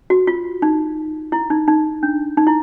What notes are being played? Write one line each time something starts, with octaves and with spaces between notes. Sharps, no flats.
F#4
F4
D#4
E4
D#4
D#4
D4
D#4
E4